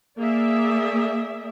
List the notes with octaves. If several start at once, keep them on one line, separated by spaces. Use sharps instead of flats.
A#3 G#4 D5 E5